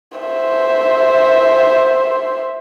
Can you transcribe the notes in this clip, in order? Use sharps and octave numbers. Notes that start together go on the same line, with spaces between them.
C5 E5